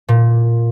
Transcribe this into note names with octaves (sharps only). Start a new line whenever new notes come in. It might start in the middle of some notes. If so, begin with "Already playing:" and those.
A#2